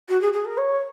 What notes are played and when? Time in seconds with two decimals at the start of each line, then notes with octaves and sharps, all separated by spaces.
0.09 F#4
0.21 G#4
0.33 G#4
0.45 A#4
0.57 C#5